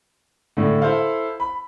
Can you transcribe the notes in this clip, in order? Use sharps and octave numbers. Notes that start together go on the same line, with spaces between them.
A2 D3
E4 A4 C5 F5
B5